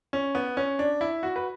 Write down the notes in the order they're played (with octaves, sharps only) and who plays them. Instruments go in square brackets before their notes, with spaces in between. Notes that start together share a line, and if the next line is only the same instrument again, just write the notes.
[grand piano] C#4
B3
C#4
D4
E4
F#4
B4